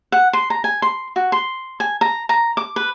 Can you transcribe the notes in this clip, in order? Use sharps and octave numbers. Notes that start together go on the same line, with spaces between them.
F#5
C6
A#5
G#5
C6
F#4
C6
G#5
A#5
A#5
D6
B4